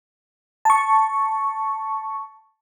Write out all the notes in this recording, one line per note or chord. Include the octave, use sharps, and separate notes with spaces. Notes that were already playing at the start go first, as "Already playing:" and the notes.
A5 C#6